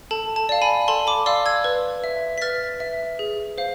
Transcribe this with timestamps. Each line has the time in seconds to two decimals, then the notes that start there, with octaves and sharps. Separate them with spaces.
0.11 A4 A5
0.36 A5
0.49 D5 F5
0.62 G#5 B5
0.88 A4 A5 C6
1.07 B5 D6
1.26 D5 F5 C6 E6
1.46 E6 G#6
1.64 B4
2.04 E5
2.38 B6
2.42 B4 F6 A6
2.80 E5
3.19 G#4
3.58 C5 F5